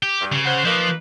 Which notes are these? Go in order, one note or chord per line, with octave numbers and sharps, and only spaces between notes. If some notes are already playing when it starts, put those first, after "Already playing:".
G4
G2
C#3
C5 F#5
F3 A#3 D#4 B4